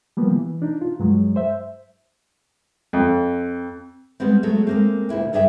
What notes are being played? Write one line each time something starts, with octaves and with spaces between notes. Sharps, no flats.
F3 G3 A#3 B3
E3
D4 D#4
F4
G2 F#3 G#3
C5 E5
F2
G3 G#3 B3 C4
F#3 G#3 A3
G#3 A#3 C4
D2 A#2 E4 G5
G2 D3 G#4 D5 E5 G5